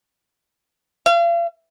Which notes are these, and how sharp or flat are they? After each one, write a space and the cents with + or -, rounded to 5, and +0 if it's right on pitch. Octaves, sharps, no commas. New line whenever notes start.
F5 -40